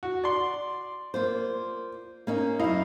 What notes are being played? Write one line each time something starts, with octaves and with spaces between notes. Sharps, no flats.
F#4
D5 C6
A#3 F4 C5
A#3 C#4 D#4
F#2 D#4 E4 F5